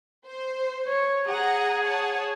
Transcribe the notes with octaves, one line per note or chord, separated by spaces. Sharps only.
C5
C#5
G#4 F#5 A#5
C#5 F#5 A5